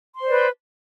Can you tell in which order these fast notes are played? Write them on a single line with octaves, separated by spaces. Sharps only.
C6 C5 D5 B4